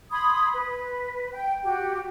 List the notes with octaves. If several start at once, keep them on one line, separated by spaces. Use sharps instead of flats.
B5 C6 D#6 G#6
B4
G5
F#4 G4